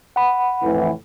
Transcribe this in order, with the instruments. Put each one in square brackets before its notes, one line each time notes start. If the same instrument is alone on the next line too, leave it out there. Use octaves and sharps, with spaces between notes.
[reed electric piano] F#5 B5
[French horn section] F2 A2 E3